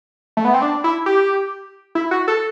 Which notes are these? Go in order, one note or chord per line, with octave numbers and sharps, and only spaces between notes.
A3
B3
C4
D4
E4
G4
E4
F#4
A4